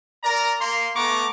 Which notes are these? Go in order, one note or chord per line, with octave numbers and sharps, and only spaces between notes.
A#4 D5 A#5
A#3 C6
A3 B3 A#5 C#6 D6